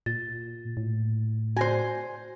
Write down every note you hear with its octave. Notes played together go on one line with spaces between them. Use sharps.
A#2 A6
A2
F#4 C5 G#5 A#6